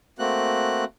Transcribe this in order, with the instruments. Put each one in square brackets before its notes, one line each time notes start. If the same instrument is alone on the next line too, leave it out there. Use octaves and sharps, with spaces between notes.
[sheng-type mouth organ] A3 A#3 C4 F#4 F#6